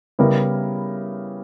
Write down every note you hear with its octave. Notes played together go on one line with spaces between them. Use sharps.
C#3 G3 B3 E4 A#4